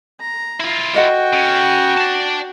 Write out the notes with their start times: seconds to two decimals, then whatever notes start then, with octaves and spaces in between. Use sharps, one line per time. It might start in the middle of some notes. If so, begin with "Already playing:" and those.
0.20 A#5
0.60 E4 F4
0.94 F#4 A4 D#5 F#5 G5
1.33 C#3
1.97 D5 A5